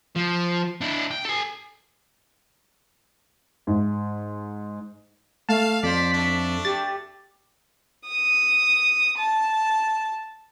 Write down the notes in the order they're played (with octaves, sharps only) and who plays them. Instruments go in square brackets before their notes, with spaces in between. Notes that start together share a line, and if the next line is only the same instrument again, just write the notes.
[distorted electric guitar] F3
D4 E4
G5
A4 G#5
[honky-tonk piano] G#2
[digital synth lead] A3 [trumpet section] F5 [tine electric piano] A5
[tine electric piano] F2 [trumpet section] C5 D5 [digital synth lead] B6
[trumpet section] A3 D4
[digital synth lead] G4 [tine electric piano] A6
[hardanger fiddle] D#6
A5